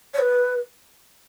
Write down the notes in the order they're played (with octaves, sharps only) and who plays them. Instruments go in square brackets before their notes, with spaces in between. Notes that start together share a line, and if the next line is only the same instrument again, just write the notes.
[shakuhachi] C#5
B4